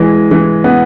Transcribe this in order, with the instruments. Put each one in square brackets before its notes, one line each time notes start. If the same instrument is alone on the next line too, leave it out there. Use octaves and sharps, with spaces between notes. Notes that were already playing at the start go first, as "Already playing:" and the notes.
Already playing: [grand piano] E3 G#3
E3
B3